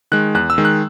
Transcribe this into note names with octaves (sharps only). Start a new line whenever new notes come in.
D#3 G#3 F#6
E2 F#6
E6
D#3 G#3
F#6